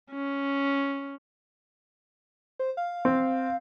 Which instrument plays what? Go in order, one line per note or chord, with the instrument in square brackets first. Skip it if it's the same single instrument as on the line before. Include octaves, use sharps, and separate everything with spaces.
[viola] C#4
[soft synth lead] C5
F5
[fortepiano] C4